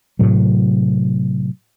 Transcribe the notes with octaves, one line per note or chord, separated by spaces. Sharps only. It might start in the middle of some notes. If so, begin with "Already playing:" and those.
A2 C3 F#3